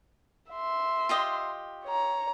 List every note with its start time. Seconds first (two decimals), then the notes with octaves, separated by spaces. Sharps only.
0.51 E5 C6
1.09 F4 G4 D#5
1.85 C#5 A#5